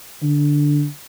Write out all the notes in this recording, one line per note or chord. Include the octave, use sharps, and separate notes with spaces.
D3